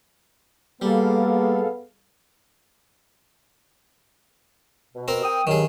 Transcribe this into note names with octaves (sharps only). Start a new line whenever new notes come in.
G3 A#3 B3 G#4 A4 F5
B2
C4 A#4
G5 D#6
G2 D#3 F#3 G#4